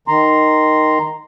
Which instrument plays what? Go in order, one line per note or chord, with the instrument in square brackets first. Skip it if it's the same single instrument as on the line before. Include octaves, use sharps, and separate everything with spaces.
[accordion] D#3 A#5 C6